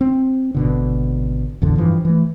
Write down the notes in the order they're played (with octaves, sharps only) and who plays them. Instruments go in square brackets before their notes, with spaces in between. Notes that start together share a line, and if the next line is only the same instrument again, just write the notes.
[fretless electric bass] C4
G#1 B2 D3
A1 E2 D3
G2 E3 F3
E3 A3